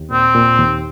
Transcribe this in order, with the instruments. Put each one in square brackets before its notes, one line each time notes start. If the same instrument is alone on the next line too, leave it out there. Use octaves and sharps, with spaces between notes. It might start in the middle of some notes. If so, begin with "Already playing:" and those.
Already playing: [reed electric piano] D#2
[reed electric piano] A#2 [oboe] C4
[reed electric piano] A#2
D#2